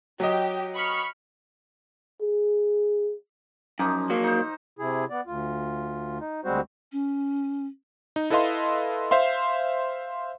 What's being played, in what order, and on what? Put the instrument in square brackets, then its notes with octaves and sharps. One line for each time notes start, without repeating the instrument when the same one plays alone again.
[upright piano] F#3 D#5 [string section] G4
[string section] B5 C#6 F6
[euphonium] G#4
[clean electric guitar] F#2 [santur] F3 A#3 D#4
[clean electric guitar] F#3 A#3
[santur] D#4 C5
[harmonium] C3 E4 G#4
B3 D5
D2 F4
D#4
D2 G3 G#3 C4 F#4 C5
[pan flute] C#4
[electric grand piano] D#4
E4 A4 B4 D#5 F5 C6
C5 E5 F5 C6